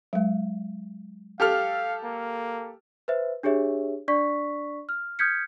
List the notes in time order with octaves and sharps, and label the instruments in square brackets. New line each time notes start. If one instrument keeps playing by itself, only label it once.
[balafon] F#3 G#3
[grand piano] G4 A4 F6 [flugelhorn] F5
[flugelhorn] A#3
[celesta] B4 C5 E5
D4 G4 G#4 C#5 E5
D4 D5 C#6 B6
F6
D#6 F6 G6 G#6 B6 C#7